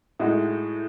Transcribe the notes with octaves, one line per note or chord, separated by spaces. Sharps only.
A2 G#3 D#4 F#4